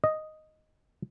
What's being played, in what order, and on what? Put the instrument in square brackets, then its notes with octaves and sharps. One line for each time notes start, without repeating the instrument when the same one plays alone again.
[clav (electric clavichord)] D#5